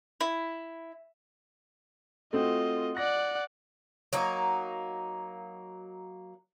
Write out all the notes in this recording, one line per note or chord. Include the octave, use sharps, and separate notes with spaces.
E4
A3 C4 F4 F#4 D#5
D5 F#5 A#6
F#3 A#3 D#4